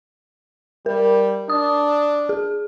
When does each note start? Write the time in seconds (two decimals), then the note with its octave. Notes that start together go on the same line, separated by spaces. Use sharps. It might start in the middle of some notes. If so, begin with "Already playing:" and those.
0.86 G3 A#4
1.49 D4 D#6
2.29 G#4